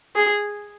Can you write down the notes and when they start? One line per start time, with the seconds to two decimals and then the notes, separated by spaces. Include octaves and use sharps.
0.15 G#4